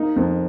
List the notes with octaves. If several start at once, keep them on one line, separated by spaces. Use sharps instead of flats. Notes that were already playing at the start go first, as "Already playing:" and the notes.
Already playing: A#3 D#4
F2